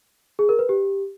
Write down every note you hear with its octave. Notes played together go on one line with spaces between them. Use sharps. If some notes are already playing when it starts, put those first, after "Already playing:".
G#4
A#4
B4
G4